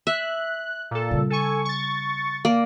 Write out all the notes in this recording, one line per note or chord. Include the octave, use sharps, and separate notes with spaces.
E5 F#6
A#2 A4
C#3 G3
A4 G#5 C#6
C#6 A6
A#3 D5